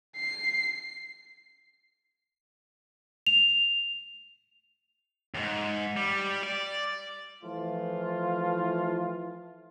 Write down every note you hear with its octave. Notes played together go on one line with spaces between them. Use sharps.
C7
F7
D#2 G#2
G3
D5
E3 F3 A3 F4